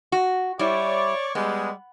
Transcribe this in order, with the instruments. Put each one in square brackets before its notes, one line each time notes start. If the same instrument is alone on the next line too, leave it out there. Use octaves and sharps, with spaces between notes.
[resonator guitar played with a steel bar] F#4
[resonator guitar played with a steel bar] G3 E4 [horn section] C#5 D5
[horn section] G3 G#3 [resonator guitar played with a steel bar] B3